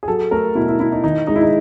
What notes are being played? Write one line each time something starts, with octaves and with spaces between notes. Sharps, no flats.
G#4
F#3 A4
A3 A#4
B2 E4
E4
B2 E4
D#4
D#3 D#4
G#3 D#4
E4
D#4